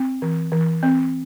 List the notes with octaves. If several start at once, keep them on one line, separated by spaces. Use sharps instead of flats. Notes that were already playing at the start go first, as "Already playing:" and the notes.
Already playing: C4
E3
E3
C4